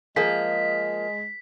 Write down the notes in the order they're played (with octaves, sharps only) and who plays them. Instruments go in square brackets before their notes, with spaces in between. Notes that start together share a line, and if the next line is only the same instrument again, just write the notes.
[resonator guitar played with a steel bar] F3 A#3 [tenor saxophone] G#3 [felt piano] G#4 [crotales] B6